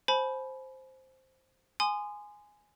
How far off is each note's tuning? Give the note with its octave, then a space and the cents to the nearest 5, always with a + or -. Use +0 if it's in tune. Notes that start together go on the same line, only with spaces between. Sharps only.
C5 +0 G#5 +40 B5 +0
G#5 +0 C6 -25 D#6 -30